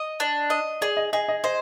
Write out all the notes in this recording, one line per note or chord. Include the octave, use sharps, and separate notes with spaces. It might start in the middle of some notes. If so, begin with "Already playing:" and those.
Already playing: D#5
D4
D#5
G#4 D5
D#5
G#4 D#5
D#5
C5 D#5